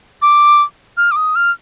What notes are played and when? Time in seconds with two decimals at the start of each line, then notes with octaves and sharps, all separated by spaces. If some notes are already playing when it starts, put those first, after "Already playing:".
0.22 D6
0.97 F6
1.11 D6
1.16 D#6
1.36 F6